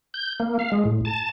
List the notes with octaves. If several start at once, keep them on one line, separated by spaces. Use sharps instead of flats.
G6
A#3
F5
G#3
A2
A5